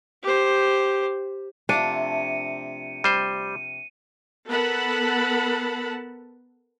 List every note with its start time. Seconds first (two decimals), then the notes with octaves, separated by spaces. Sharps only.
0.23 G4 C5
1.69 C3 F3 A3 D4 C#7 D#7
3.04 G3 C5 D#7
4.49 B3 A4 A#4 F#5 A5 B5